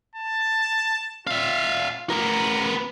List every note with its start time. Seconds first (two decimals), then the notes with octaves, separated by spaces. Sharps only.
0.16 A5
1.27 F4 E5 F5
2.10 B3 A#4 A#5